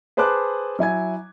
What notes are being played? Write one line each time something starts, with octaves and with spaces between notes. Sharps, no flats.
G#4 B4 C5 A5 D6 F#6
F#3 E4 G#5 G#6